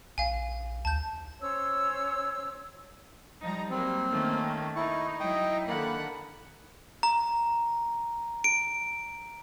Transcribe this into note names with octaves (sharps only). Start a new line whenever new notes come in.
A#1 F5 G#5
D2 A5 G6
C#4 C5 C#5 E6
F3 G3 D#4 A#5
F#3 G3 A#3 C4
D#3 A3 A#3 C#4
D#4 E4 C#6
F#3 E4 D#5 G5
D3 D#3 A#3 F#5 B5
A#5
D7